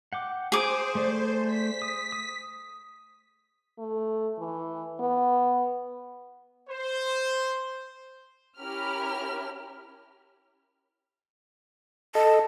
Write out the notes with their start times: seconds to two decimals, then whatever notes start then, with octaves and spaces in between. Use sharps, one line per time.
0.13 F#5 G5 D6
0.52 G#4 C5 G#5 D6
0.95 A3 D5
1.46 B6
1.82 D#6
2.12 D#6
3.79 A3
4.39 E3
5.00 B3
6.70 C5
8.60 C#4 E4 G4 A#4 B5 F6
12.15 A4 D#5 A5